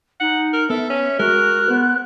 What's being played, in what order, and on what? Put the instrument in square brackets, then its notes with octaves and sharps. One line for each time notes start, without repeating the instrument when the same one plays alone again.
[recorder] D#4 [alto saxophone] F#5
[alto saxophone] A#4
[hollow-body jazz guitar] B3 [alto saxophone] A4 [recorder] E5
[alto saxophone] C#4
[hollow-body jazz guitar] G#3 [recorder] F#4 [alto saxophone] A#4 [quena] F#6
[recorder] B3 [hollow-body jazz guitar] B4 C5